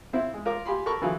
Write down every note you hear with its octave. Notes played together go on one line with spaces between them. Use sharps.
C3 C4 E4 F4
G#3
F4 A#4 D6
F4 G4 G#5 B5 C6
A4 A#4 B5 C#6
D3 E3 F#3 F4 G#4